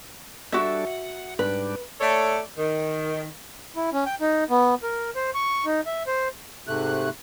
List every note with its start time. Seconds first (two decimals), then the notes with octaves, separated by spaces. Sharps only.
0.52 G3 D4 F#4 A4 E5
0.87 F#5
1.39 G#2 G3 D4 B4
2.01 A3 A4 C#5 D5
2.57 D#3
3.76 E4
3.93 C#4
4.06 G5
4.21 D#4
4.50 B3
4.83 A#4
5.15 C5
5.34 C#6
5.65 D#4
5.86 E5
6.07 C5
6.67 G#2 C3 A3 F#6